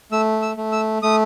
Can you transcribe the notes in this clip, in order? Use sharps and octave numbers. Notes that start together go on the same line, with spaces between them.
A3 E6
E6
A3
E6
A3 D#6